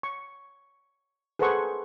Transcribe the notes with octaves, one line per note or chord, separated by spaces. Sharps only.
C#6
G#4 A4 B4 C5 F#5 C#6